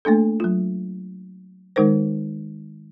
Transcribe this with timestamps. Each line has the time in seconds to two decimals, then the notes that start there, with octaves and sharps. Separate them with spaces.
0.05 A3 A#3 D4 A4
0.40 F#3 F4
1.76 D#3 G#3 D#4 A#4 C5